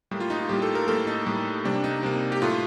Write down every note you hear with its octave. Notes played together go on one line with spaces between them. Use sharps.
A2 G3 A#3
F4
D#4
F4
A2 G3 A#3 G4
A4
A#4
A2 G3 A#3 A4
D#4
A2 G3 A#3
C3 G3 A#3 D4
D#4
C3 G3 A#3
G4
A2 A3 F4